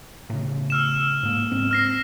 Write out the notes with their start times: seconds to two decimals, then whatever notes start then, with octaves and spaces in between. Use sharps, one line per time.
0.30 A2 C#3
0.70 E6 F6 E7
1.23 G#2 A#3
1.52 G#2 B3 C4
1.71 F6 A#6 C7